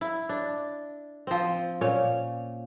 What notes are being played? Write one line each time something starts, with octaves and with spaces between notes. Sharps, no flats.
E4
D4
F3 C4
A#2 C#4 C#5